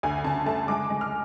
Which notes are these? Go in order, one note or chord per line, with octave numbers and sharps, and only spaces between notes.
D2 G#5
C#3 A5
A3 A5
G#3 D6
G#3
F6